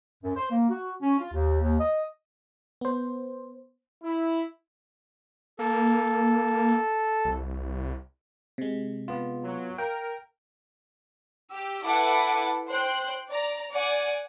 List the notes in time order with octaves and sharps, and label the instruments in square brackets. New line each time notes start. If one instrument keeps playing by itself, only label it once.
[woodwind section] F#2
C5
A#3
F#4
C#4
F4
D#2
D#2
D#5
[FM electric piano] B3 C5
[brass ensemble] E4
[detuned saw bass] A#3 [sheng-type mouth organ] A4
[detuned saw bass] C2
[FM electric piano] C3 G#3
[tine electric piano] B3 F4
[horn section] F#3
[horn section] A#4 [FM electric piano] F5 [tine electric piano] G5
[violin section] G4 E6
E4 A4 B4 F#5 A5 D6
C5 G5 F#6
D5 A#5
D5 F#5 G#5